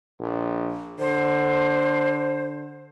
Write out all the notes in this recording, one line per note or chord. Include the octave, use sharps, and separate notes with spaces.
A#1
D3 C5